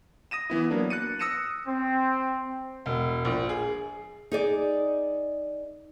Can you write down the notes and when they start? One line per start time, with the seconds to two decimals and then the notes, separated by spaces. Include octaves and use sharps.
0.31 D#6 A#6 D#7 E7
0.50 E3 B3 E4
0.70 F#3 A#3 B3 D4
0.90 F#6 A6 C#7 D#7
1.19 D#6 E6 A#6 C#7 D#7 E7
1.67 C4
2.86 E1
3.25 A#1
3.49 G#4
4.31 D#4 G#4 D5